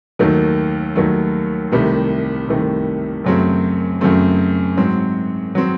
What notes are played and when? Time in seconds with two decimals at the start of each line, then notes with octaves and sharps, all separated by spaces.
0.19 D#2 D#3 F#3 A3
0.96 D#2 D#3 F#3 A3
1.72 C2 C3 D#3 A3
2.48 C2 C3 D#3 A3
3.24 F#2 C#3 F#3 A3 C4
4.01 F#2 C#3 F#3 A3 C4
4.77 G#2 F#3 C4
5.55 F#3 C4